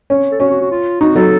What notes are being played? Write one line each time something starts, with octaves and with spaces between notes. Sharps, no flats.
C#4
A4
C#4 F#4
F#4
F#4
F4
D#4 F#4
F#3 A4